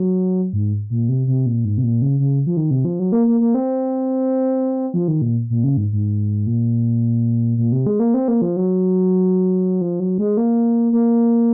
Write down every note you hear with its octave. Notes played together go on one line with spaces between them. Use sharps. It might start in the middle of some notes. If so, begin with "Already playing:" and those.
Already playing: F#3
G#2
A#2
C3
C3
A#2
G#2
C3
A#2
C#3
C#3
F3
D#3
C3
F3
F#3
A#3
A#3
A#3
C4
F3
D#3
A#2
A#2
C#3
G#2
G#2
A#2
A#2
C3
G#3
A#3
C4
A#3
F3
F#3
F3
F#3
G#3
A#3
A#3